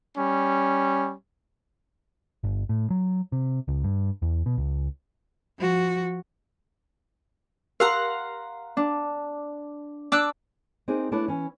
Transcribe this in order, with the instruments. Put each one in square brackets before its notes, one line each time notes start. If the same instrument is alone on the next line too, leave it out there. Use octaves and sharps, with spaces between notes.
[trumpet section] G3 C#4
[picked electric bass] G1
A2
F#3
C3
C#2
G2
E2
B2
C#2
[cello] F3 F#4
[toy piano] G4 A#4 [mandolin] F5 F#5 A#5 [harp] C6
[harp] D4
[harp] D4 [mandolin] D6 E6 F#6
[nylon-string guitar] C4 D4 D#4 G#4 A#4
A3 D4 E4 B4 C#5
E3 C#4